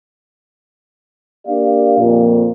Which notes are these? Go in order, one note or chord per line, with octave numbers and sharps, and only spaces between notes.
A#3 D4 G4 D5 F5
F2 A#2